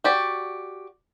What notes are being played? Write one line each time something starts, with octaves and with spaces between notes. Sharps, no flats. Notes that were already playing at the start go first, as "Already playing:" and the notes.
F#4 G4 D5